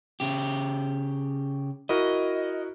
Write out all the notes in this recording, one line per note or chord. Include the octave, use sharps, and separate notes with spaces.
C#3 G4
E4 F#4 A#4 D#5